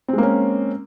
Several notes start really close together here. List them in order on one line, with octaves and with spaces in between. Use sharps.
C4 G#3 A#3 C#4